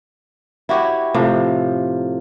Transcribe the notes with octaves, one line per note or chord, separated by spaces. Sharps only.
E4 F#4 G4 C#5
A2 C3 F3